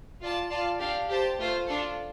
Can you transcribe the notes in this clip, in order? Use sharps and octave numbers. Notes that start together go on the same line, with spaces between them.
F4 D5 A5
F4 D5 F5 A5
D4 G4 F5
G4 C5 A5
A3 F4 C5
D4 F4 A4